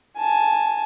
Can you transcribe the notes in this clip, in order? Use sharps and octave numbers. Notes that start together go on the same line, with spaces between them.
G#5 A5